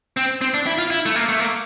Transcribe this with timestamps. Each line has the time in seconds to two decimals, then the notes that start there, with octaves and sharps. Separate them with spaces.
0.17 C4
0.41 C4
0.54 D4
0.66 E4
0.78 F4
0.90 E4
1.06 A3
1.15 A#3
1.29 A3
1.40 A#3